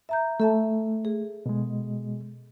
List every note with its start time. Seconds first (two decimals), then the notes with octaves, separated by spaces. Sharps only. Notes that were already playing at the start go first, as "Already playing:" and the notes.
0.09 E5 A#5 G6
0.40 A3 A4 E5 A5
1.05 G#4
1.46 B2 G#3